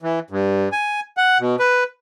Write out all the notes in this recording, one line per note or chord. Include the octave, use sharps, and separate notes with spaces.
E3
G2
G#5
F#5
B2
B4